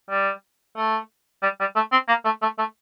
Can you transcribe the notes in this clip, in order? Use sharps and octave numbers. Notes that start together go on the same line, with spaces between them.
G3
A3
G3
G3
A3
C4
A#3
A3
A3
A3